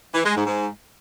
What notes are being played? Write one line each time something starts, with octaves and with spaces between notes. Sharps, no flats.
E3
G#3
G#2
G#2